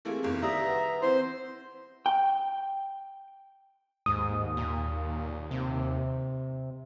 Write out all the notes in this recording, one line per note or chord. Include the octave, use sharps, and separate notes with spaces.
E3 A3 A#3 C4 G4 G#4
F1 E2 A#3 E4 F5
D#3 G3 E5 A#5 D#6
B4 F#5
E3 C4 C5 C6
G5
D#2 G#2 D#6
A#2
C3